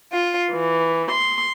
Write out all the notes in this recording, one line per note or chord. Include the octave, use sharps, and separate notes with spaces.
F4
E3
C6